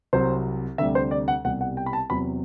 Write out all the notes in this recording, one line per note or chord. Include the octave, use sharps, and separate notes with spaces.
C2 C3 F#3 C5
D2 C3 G3 E5
C5
D5
F#5
C2 B2 G3 F#5
F#5
G5
B5
A5
E2 C3 F#3 B5